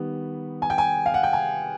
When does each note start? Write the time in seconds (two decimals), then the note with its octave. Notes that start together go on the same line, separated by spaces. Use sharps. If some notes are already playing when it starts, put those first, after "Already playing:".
Already playing: D#3 G3 B3
0.62 G#5
0.70 G5
0.78 G#5
1.06 F5
1.14 F#5
1.23 G5
1.33 G#5